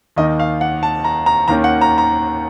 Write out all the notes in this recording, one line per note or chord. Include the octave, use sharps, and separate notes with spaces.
D#2 D#3 A#3 D#4 D#5
F5
F#5
A5
A#5
A#5
D#2 D#3 A#3 C#4 A#5
F#5
A#5
A#5